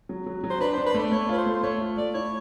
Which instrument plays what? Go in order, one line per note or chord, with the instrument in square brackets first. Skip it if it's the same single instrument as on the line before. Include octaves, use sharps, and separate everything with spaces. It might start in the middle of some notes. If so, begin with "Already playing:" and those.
[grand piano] F#3
F#3
F#3
[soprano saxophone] C5
[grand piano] D4 [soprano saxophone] B4
[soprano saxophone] C5
[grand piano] D4
[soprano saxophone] B4
[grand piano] A3 [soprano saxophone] D5
[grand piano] A3 [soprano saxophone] C#5
[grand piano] F4 [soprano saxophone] B4
[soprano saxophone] C5
[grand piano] A3
[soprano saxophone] C5
[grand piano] A3 [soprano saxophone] C#5
[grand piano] F4
[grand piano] A3 [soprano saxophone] D5
[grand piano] E4 [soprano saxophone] C#5